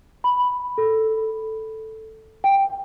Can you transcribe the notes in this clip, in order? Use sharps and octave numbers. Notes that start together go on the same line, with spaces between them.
B5
A4
G5